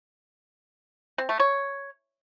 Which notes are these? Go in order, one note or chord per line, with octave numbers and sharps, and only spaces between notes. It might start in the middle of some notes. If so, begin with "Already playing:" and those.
C4
A3
C#5